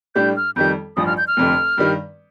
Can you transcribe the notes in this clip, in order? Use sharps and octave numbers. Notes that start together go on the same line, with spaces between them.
A2 G3 D4 G4 G6
F6
F2 D#3 G3 G6
A1 G2 F3 D#6
F6
G6
F6
F1 F2 D3
G2 D#3 G3